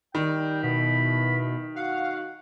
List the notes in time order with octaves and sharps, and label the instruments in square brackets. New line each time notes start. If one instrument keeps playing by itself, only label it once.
[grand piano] D#3 [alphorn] G3 [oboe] G5
[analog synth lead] B2 [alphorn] E4 [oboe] B5
[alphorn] F#4 [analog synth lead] F5 [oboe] F#5